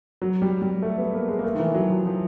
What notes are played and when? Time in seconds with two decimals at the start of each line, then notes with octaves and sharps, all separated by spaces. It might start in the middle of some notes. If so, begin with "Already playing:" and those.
0.22 F#3
0.42 G3
0.62 G3
0.82 A3
0.98 B3
1.13 A#3
1.28 G#3
1.39 A#3
1.44 A3
1.54 D#3
1.59 E3
1.74 F#3
1.90 F3
2.06 F3